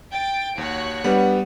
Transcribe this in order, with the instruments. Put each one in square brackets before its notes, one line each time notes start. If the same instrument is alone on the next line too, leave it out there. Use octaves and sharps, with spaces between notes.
[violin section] G5 A6 D7
[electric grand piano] D#2 [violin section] F#4 C#5 F#6
[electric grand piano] G3 B3 [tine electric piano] D4 B4 [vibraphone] F#5